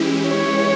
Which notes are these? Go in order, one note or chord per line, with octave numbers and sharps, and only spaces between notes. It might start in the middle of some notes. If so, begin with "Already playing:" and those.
Already playing: E3 G#3 C#4 E4 G4
C#5